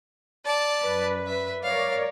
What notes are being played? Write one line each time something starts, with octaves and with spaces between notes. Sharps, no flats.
D5 A5
F#2 B4
E5
A#4 C#5 D5 F5